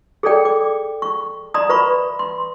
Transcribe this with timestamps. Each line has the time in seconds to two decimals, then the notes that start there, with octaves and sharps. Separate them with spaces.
0.23 G#4 A4 C#5 D5 G5
0.45 D6
1.02 C#6
1.54 D5 A#5 C6 D#6
1.69 B4 E5 A#5 B5 C#6
2.19 C6